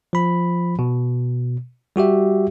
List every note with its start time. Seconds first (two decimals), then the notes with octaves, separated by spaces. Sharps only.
0.13 F3 B5
0.79 B2
1.96 G3 F#4 G4 E5